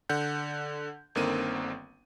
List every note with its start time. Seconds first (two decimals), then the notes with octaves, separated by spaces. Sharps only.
0.09 D3 F#5 G6
1.15 G1 D3 D#3 A#3 C4 D#7